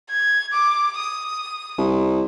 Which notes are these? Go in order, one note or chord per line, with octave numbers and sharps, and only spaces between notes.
G#6
D6
D#6
C2